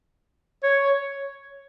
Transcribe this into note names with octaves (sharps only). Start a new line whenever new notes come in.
C#5